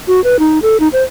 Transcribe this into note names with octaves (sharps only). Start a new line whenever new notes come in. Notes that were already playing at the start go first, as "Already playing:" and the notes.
F#4
B4
D#4
A4
D#4
C5